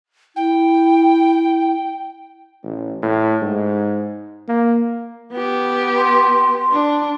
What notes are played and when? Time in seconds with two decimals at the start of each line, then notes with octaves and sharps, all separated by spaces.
0.36 E4 G5
2.63 A1
3.02 A2
3.42 G#2
4.48 A#3
5.33 B3 G4
5.98 C6
6.72 D4